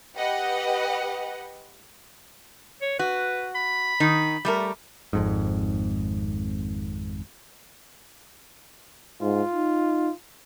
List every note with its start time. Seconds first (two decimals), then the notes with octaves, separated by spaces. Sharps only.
0.16 G4 B4 D#5 F#5
2.82 C#5
2.99 F#4 B4
3.55 B5
4.00 D#3 D#4
4.45 G3 A3 A#4
5.13 G#1 F2 G#2
9.22 G#2 F4
9.52 D#4